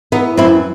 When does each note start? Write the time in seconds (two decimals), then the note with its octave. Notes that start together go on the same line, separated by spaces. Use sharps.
0.12 E3 B3 D#4
0.37 F#2 C4 E4